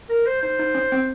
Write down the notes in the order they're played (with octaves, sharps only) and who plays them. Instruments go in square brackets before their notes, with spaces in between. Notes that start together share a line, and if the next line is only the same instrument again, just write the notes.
[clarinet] A#4
C5
[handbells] D#4 [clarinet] C5
[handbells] D#4
C#4
C4